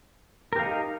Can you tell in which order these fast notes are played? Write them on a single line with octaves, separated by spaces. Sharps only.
A#4 G4 F5 D#4